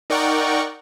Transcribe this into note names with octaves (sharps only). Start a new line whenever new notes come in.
D#4 A#4 D5 F#5 G5 C#6